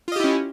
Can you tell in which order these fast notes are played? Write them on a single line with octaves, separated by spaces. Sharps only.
F4 D#5 G4 E4 C#4